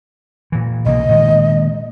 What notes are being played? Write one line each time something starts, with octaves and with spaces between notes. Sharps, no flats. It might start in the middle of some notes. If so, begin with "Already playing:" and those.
A#2 E3
B1 C#3 A#3 D#5
A#2 D#3 G#3